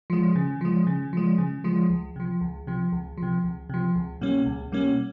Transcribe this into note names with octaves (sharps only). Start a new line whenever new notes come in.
F3 G#3
C#3
F3 G#3
C#3
F3 G#3
C#3
F3 G#3
C#2
C3 F3
C#2
C3 F3
C#2
F3
C3
C#2
C3 F3
C#2
B2 G3 A#3 C#4
C#2
B2 G3 A#3 C#4